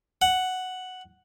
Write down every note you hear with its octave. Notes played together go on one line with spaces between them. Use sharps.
F#5